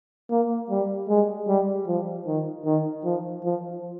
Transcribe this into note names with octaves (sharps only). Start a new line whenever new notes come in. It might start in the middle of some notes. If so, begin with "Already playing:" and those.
A#3
G3
G#3
G3
F3
D#3
D#3
F3
F3